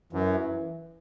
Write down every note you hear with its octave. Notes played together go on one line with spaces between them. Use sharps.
F#2 E3